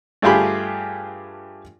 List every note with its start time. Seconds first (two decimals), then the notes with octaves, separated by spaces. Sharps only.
0.22 G2 A3 F4 G4 G#4 B5